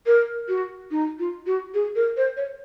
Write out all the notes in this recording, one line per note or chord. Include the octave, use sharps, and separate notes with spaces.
A#4
F#4
D#4
F4
F#4
G#4
A#4
C5
C#5